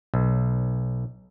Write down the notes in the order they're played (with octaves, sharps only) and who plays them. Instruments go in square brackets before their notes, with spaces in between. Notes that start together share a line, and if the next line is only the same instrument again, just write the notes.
[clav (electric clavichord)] B1